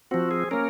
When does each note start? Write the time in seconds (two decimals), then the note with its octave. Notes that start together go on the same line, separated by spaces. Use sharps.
0.11 F3 C4 F#4
0.31 G#4
0.51 A#3 C#4 A#4